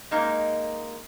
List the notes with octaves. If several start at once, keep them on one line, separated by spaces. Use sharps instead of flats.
G#3 A#3 D#4